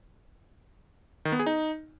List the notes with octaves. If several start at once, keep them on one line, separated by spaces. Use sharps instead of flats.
D#3
B3
G#4
D#4